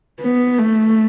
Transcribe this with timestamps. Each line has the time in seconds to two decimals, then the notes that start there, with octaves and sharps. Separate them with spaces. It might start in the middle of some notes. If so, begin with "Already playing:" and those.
0.20 B3
0.59 A3